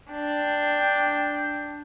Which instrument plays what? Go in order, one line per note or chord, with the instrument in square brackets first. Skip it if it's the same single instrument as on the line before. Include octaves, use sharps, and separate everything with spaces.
[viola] D4 G5